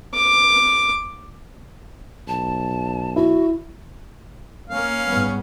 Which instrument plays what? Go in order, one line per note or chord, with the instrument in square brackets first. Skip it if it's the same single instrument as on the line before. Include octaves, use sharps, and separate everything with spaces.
[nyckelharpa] D6
[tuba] B1 [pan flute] A5
[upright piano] E4 [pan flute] F#4
[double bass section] A#3 [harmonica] C#4 F5
[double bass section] G#2 G3 B3